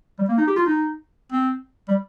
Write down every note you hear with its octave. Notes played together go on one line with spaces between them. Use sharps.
G3
A#3
D#4
G4
F4
D#4
C4
G3